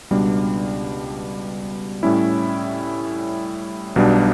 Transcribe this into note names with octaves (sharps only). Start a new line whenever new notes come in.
C#2 B2 G3 D4
A2 G3 C#4 E4
B1 B2 G3 D4